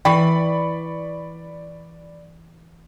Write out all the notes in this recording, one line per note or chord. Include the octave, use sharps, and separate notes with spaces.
E3 D5 G5 B5 C#6